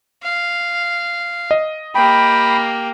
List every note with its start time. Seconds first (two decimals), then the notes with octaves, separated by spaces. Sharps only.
0.23 F5
1.51 D#5
1.95 A#3 G4 G5 B5